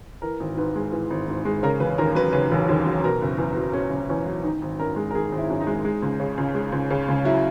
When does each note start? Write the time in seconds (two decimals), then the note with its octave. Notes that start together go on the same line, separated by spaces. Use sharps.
0.22 E3 A#4
0.40 G#1
0.57 G#2 B4
0.76 G#3
0.92 E3
1.10 G#1
1.28 G#2
1.45 G#3
1.63 C#3 A#4
1.80 E1 B4
1.98 D#2 A#4
2.15 F#3 B4
2.33 C#3 B4
2.51 E1
2.69 D#2
2.86 F#3
3.04 B2 A#4
3.22 F#1
3.38 E2 B3
3.56 F#3
3.73 B2 C#4
3.91 F#1
4.09 E2 C#4
4.26 F#3
4.43 D#3 D#4
4.62 G#1
4.79 F#2 A#4
4.96 G#3
5.11 A#4
5.15 D#3 G#4
5.32 G#1
5.38 E4
5.50 F#2
5.61 D#4
5.67 G#3
5.85 G#3
6.02 C#2
6.19 C#3
6.37 C#2
6.55 G#3
6.72 C#2
6.90 C#3
7.08 C#2
7.25 F#3 E4